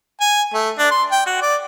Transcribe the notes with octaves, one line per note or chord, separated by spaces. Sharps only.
G#5
A3
D4
C6
G5
F#4
D5